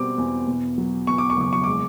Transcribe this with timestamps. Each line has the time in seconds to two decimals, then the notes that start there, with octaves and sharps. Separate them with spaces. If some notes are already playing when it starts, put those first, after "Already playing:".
Already playing: B2 G3 C4 D6
0.18 E2
0.48 B2
0.78 F#3
1.07 E2 C#6
1.18 D6
1.30 C#6
1.37 F#1 D6
1.53 C#6
1.64 G#3 D6